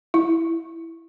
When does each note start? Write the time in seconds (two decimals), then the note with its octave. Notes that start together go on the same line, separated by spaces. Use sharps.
0.14 E4